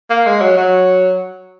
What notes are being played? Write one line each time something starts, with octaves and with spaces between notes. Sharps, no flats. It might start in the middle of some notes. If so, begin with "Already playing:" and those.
A#3
G#3
F#3
F#3